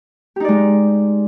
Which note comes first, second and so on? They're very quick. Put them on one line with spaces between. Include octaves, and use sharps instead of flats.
G4 D#4 D5 G#3